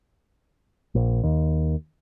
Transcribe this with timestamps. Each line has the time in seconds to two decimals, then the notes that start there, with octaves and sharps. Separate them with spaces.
0.95 A#1
1.23 D#2